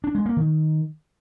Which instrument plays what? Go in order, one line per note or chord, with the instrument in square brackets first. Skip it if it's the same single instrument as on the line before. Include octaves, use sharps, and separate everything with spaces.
[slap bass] D4
G#3
A#3
D#3